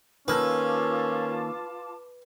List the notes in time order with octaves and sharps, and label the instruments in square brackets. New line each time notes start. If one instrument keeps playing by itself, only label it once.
[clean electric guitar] D#3 A#3 A4 [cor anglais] C#4 [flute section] F4 A5 D6 [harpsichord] B4